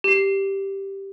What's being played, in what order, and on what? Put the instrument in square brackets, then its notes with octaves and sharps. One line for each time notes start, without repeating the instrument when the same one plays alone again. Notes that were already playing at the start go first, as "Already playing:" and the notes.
[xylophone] G4 C7